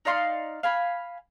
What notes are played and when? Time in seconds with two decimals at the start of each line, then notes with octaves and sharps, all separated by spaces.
0.05 D#4 D5 F5 C6
0.63 F5 G#5 B5